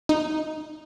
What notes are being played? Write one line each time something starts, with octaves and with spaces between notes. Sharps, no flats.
D#4